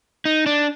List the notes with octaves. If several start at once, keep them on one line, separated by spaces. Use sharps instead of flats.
D#4
D4